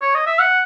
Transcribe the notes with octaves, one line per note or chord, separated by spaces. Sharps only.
C#5
D#5
E5
F#5